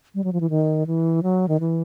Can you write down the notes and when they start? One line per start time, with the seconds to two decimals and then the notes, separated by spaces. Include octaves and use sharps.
0.15 G3
0.24 F#3
0.33 F3
0.41 E3
0.50 D#3
0.87 E3
1.23 F#3
1.48 D#3
1.60 E3